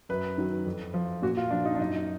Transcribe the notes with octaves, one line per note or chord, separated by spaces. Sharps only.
F#2 B4
D#3 F#3
F2
F3
A#2 F#4
F4
F3 D4
D#4
D4
F#2 D#4